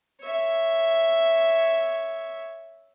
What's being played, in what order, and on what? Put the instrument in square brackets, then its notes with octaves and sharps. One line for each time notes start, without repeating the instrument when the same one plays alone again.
[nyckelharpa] C#5 E5